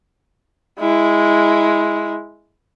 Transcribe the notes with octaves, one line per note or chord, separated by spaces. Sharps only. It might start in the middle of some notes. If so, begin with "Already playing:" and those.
G#3 E4